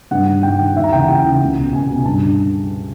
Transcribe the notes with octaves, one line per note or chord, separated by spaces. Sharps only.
G2 F#5
D#3
G2 G5
D#3
D#2 E5
A#5
C#3 E3 G5
F#5
D#2 G5
C#3 E3
C#2
B2
C#2 G#5
B2
G2 A5
D3